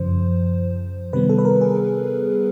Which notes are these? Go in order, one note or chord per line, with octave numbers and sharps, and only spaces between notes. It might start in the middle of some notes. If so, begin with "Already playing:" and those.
Already playing: F#2 C#3 F3 C5
C3 D#3 G3 B3 B4
A4
B4
A#4
G#4